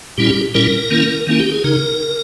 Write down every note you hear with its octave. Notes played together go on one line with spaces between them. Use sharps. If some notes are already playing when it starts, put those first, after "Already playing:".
A#2 G3 C#4 E4 G4
G4
A#2 G3 C#4 E4 A#4
D#3 A#3 C#4 E4
D#3 A#3 C#4 E4
G4
G#4
C#3 D#4 A#4